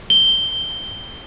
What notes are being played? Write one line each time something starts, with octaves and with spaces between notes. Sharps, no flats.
G7